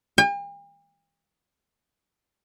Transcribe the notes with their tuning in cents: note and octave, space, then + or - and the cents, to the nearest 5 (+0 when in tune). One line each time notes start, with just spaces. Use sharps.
G5 +45